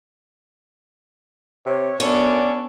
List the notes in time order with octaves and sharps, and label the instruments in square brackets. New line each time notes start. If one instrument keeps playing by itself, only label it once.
[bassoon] C3 [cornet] C#5
[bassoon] F#2 [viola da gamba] B3 D4 A4 [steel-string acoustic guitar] C#4 [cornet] D5